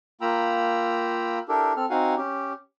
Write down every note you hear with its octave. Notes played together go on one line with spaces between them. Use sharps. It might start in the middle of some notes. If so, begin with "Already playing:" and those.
A#3 F4 G5 A#5 B5 E6
D4 E4 G4 A4 A#4
C4 A4 F6
C4 D#4 F#4 F5 F#5 G#5
C#4 G4